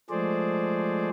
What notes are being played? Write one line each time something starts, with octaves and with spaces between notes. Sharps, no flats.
F3 G#3 A3 G#4 C5 D5